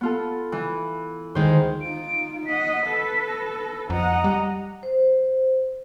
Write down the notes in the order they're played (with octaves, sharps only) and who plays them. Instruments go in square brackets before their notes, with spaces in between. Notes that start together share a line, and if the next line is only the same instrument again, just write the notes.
[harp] B3 F4 A4
E3
[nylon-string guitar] D2 D#3 G#3 [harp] C5
[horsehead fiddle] D#4 F4 [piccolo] D7
[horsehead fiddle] D#5 F#5 [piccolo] B6
[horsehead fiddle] A4 B4
[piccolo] A#6
[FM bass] F2 [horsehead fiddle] D#5 F#5 [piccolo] A#5
[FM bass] G3
[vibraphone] C5